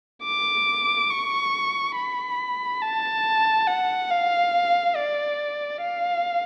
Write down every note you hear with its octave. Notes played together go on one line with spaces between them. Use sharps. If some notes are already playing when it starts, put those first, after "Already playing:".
D6
C#6
B5
A5
F#5
F5
D5
F5